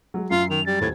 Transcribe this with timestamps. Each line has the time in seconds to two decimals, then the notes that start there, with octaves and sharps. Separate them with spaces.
0.14 F#3 G#3
0.30 F#2 F4 C7
0.50 D#3 F7
0.66 G3 A6
0.81 D#1 A2 G#6